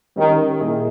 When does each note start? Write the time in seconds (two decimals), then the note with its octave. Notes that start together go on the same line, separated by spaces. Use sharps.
0.16 D#3 G3 C#4 G4 A#4
0.61 A#2 A#3 E4 G#4 D#5